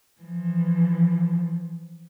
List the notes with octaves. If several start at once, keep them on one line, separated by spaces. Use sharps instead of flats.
E3 F3